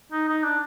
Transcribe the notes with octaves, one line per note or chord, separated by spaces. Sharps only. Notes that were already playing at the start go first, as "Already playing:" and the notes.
D#4
D#4
D4